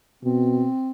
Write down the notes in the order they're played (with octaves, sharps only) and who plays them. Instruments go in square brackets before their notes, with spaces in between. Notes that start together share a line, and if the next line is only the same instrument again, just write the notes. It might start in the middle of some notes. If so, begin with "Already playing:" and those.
[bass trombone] B2 [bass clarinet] C4